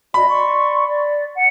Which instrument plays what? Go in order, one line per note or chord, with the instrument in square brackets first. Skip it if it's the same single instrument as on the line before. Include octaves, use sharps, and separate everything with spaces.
[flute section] F#4 D5 D#5 [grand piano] B5
[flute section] D5 C6 C#6
D5
F#5